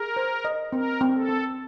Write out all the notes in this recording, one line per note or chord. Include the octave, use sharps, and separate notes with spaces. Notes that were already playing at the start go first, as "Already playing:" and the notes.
Already playing: G#4 A#4
C5
D#5
C4 A#4
C4
A4
C4